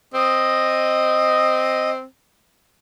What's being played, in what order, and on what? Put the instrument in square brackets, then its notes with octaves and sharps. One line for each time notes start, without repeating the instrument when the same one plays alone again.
[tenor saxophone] C4 [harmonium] D#5